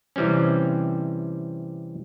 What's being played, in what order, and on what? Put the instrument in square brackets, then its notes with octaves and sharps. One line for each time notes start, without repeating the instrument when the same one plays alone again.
[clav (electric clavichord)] C3 E3 G3 C4 C#4